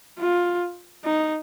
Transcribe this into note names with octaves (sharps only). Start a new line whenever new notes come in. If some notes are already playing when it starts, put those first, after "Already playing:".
F4
D#4